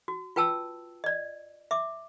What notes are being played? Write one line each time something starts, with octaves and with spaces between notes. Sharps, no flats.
F#4
F4 B4 G5 A5 E6
D5 D#5
E5 D6